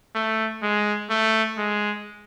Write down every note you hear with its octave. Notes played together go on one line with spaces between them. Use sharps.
A3
G#3
A3
G#3